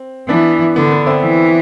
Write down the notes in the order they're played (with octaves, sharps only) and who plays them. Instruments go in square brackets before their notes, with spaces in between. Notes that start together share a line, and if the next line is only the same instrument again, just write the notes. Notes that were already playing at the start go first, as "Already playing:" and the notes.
Already playing: [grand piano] C4
[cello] E3 [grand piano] B3 D4
[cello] D3 [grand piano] B3
[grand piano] B3
C4 E4
[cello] E3